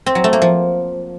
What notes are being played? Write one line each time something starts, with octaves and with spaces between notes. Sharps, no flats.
C4
F#3
A3
A#3
F3